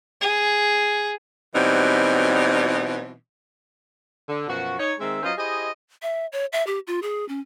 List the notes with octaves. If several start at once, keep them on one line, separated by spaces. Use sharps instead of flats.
G#4
B2 E3 F#3 G3 C4 D#4
D3
F#2 B2 F3 F#4
D#4 C#5
D#3 G#3 C4 E5
F#3 C#4 F4 B4 C5 D#5
E4 G4 G#4 C5 D#5
E5
C#5
E5
G4
F4
G#4
C#4